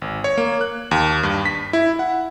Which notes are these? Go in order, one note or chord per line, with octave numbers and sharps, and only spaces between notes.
G#1
C#5
A#3
F#6
D#2
G2
B6
E4
F#5